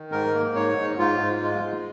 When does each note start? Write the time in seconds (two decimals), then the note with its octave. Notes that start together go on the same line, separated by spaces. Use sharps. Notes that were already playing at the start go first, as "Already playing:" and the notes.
Already playing: D#3
0.12 G#2 A#4
0.34 A#3
0.55 G#2 C#5
0.77 G#2
0.98 G#2 F4
1.20 G#2
1.42 G#3 F4
1.64 G#3